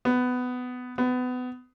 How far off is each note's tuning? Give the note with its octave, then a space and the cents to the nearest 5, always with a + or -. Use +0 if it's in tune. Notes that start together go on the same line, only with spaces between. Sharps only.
B3 +15
B3 +25